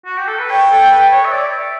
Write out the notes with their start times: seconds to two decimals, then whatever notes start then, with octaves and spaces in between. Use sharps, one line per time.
0.05 F#4
0.17 G4
0.27 A4
0.39 B4
0.50 C#5 G5
0.71 A4
0.91 B4
1.12 C#5
1.25 E5
1.32 D5
1.53 E5